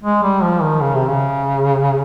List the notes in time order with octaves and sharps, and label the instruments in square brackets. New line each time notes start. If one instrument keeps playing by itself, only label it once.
[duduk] G#3
G3
F3
D#3
C#3
C3
C#3